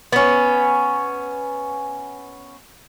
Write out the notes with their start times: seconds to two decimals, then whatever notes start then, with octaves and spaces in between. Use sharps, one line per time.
0.13 B3 C#4